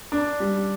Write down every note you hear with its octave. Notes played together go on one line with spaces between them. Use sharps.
D4
G3